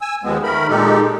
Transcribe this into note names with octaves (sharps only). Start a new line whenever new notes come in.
G#5 E6
D#2 F3 G#3 B3 C4
D#3 A3 A#4 B5
A#2 G#3 D#4 G4 A4